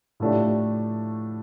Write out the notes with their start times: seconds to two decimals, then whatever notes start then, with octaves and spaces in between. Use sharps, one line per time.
0.20 A2 F3 A3 D4 G4